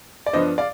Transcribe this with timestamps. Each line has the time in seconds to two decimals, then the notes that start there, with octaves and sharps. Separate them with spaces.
0.26 D5
0.33 G2 F3 B3 D4 C5 D#5
0.58 D5 F5